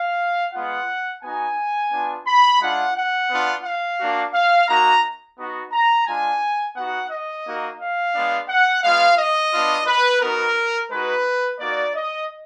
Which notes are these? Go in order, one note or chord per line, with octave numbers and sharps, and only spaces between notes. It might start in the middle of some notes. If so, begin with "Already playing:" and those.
Already playing: F5
G#3 B3 F4 F#5
B3 D#4 F#4 G#5
B3 D4 F4
B5
G#3 D4 F4 F#5
F#5
B3 D4 F4
F5
A#3 D4 F#4
F5
A#3 D#4 F#4 A#5
B3 D#4 F#4
A#5
G#3 D4 F4 G#5
B3 D#4 F#4 F#5
D#5
A#3 D#4 F#4
F5
G#3 B3 D4
F#5
G#3 B3 F4 F5
D#5
B3 D4 F4
B4
B3 D#4 F#4 A#4
G#3 D#4 F#4 B4
A#3 D#4 F#4 D5
D#5